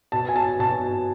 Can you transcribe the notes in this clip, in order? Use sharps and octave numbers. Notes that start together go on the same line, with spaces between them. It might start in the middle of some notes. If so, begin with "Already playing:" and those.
B2 A5
G#5
A5
B2 A5